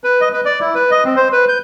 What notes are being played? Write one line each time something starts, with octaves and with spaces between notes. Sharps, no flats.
B4
D#5
B4
D5
E4
B4
D#5
C4
C5
B4
G6